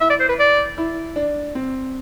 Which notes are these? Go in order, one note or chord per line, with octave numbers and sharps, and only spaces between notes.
E4 E5
D5
C5
B4
D5
E4
D4
C4